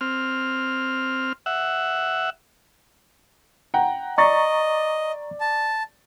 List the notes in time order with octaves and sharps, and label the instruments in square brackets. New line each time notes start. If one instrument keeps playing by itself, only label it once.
[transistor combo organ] C4 F6
E5 F#5
[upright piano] F#5 G5 A#5
[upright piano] D5 A6 [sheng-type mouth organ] D#5 [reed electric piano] A#5 C#6
[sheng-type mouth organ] A5